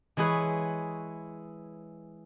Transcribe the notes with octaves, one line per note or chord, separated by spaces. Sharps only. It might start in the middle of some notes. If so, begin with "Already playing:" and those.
E3 G#3 E4 G#4 B4 C#5